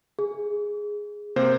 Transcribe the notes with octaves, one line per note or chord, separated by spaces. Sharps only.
G#4
C3 A#3 C5